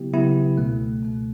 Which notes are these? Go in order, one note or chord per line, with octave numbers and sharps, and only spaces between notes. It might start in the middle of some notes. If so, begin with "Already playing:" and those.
Already playing: C#3 F#3 B3 E4 G4
C#3 F#3 B3 E4 G4
C#2 B2 A3
C#2 B2 A3